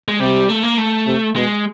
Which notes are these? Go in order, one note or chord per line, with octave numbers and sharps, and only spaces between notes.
G#3
C3 G3
A3
A#3
A3
C3
B2 G#3